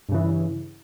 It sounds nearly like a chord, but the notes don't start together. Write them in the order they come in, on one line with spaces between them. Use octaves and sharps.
G2 C#3 E3